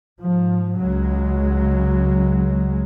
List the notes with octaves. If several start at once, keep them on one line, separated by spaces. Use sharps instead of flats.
G#2 F3
C#2 C#3 F#3 G#3